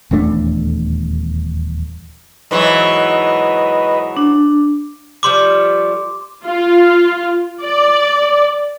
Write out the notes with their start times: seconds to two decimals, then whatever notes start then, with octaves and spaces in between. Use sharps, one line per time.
0.11 D#1 E2 A3 D4
2.51 G#2 E3 F#3 B4 D#5
4.17 D4
5.23 F3 G3 A3 C6 D6
6.46 F4
7.63 D5